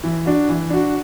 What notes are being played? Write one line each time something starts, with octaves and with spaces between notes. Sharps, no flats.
E3
D4 F#4
E3
D4 F#4